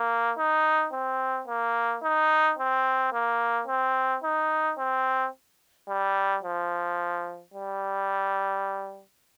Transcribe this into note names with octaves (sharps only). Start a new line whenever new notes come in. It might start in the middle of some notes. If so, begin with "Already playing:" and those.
Already playing: A#3
D#4
C4
A#3
D#4
C4
A#3
C4
D#4
C4
G3
F3
G3